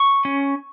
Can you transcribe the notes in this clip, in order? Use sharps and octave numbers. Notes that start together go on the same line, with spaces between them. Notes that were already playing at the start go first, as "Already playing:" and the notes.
Already playing: C#6
C#4